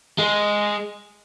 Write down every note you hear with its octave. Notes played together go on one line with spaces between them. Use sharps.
G#3